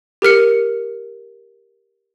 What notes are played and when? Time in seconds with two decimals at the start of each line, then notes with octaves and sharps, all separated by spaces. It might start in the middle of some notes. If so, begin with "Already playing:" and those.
0.22 G4 A#4 F6 C#7